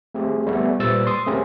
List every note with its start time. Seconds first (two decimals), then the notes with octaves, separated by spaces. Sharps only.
0.15 A3 C4 G4 G#4
0.47 G3 A3 B3
0.80 A#2 G3 B4 C5 E6 A6
1.07 C6 D#6
1.27 A3 C4 C#4 G4 G#4 A#4